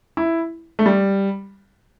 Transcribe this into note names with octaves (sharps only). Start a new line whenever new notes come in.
E4
A3
G3